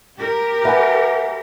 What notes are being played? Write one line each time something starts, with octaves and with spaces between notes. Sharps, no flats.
G4 A#4
B4 E5 F#5 G#5